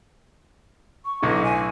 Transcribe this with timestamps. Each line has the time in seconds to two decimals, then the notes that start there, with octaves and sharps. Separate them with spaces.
1.05 C#6
1.22 B1 A2 D3 D#5
1.44 G#5